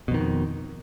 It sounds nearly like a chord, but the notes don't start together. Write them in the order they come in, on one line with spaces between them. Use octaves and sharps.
B2 F2 D#3